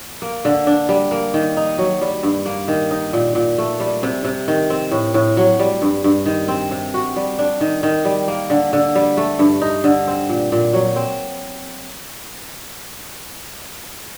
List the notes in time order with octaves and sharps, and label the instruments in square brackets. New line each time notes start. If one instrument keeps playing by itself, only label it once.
[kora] A#3
D3
D4
G3
A#3
D#3
D#4
F#3
G3
G2
A#3
D#3
D#4
A#2
A#2
A3
G3
C3
C3
D#3
C4
A2
A2
F#3
G3
G2
G2
D#3
C4
C3
F#4
G3
D4
D#3
D#3
G3
A#3
D3
D3
G3
A3
G2
D#4
D3
C4
A#2
A#2
F#3
C4